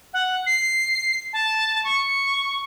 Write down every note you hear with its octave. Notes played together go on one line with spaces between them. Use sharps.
F#5
C7
A5
C#6